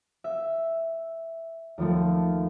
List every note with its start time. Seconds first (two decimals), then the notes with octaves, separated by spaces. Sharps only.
0.24 E5
1.78 D#2 F3 A3